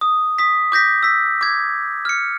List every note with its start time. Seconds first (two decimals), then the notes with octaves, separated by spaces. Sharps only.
0.01 D#6
0.38 D#6 B6
0.72 D6 G6 A#6 B6
1.03 E6 B6
1.41 D6 G#6
2.05 F6 C#7